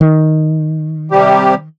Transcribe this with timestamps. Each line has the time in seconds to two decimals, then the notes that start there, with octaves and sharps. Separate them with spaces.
0.01 D#3
1.11 C3 G3 G4